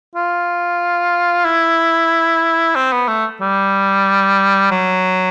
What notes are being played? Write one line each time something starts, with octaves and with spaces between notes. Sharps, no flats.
F4
E4
C4
B3
A3
G3
F#3